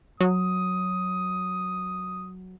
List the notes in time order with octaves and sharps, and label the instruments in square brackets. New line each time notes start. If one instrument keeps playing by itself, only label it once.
[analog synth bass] F#3 [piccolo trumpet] D#6